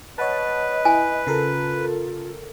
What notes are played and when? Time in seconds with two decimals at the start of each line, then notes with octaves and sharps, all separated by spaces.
0.18 B4 C#5 D#5 F#5 A5
0.85 E4 G#5
1.27 C#3 F4 A4 A#4